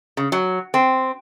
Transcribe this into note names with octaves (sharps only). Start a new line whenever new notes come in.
C#3
F#3
C4